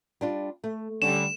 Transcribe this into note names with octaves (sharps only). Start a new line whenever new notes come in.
G3 D4 F4
A3
D3 G3 C#4 E7